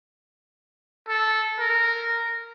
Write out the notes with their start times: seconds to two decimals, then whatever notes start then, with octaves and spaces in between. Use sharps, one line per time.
1.08 A4
1.59 A#4